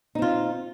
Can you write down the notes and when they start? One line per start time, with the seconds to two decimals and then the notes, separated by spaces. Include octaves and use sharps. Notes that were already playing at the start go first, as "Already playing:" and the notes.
0.15 D#4
0.19 C4
0.22 F4